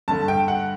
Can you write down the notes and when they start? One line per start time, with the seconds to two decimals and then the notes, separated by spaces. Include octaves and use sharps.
0.08 G2 D3 A5
0.28 G5
0.48 F#5